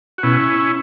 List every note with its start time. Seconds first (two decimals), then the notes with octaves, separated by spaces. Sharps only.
0.18 F#4
0.23 B2 C#4 E4